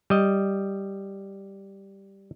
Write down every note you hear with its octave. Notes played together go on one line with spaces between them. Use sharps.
G3 D#5